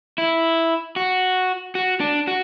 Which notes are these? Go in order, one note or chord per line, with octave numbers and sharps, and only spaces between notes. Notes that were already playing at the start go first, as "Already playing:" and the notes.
E4
F#4
F#4
D4
F#4